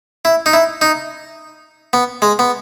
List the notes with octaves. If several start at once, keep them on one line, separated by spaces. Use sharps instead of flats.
E4
D#4
E4
D#4
B3
G#3
B3